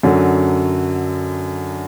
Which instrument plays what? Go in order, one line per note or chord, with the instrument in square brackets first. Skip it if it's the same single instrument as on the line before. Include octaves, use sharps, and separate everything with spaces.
[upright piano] F#2 D3 F#3